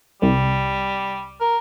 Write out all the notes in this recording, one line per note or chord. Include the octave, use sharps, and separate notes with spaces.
C2 G3
A#4